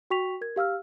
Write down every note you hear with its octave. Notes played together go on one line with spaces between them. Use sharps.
F#4 G5 C#6 B6 F7
A#4 G#6
G4 F5 E6 F6